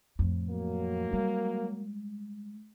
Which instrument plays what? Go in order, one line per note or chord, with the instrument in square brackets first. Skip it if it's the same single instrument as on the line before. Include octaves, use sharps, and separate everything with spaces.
[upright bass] F2 A2
[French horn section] F#3 A#3
[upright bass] G3 G#3